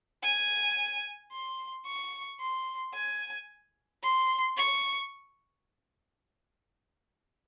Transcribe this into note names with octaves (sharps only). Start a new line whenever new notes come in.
G#5
C6
C#6
C6
G#5
C6
C#6